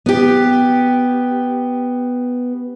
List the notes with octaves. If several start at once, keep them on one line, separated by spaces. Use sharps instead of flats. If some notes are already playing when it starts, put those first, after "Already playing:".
B3 G4